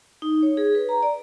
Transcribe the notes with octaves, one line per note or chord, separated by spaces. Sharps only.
D#4
C#5
G#4
B4
A#5
D5